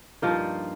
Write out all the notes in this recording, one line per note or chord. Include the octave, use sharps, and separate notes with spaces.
G2 F3 A#3 D#4 F4